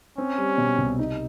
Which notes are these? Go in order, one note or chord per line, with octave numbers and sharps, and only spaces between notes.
C4 C#4
G3
B2
C2
D#4